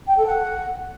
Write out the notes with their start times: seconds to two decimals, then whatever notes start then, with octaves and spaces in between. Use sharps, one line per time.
0.07 G5
0.16 A4
0.26 F#5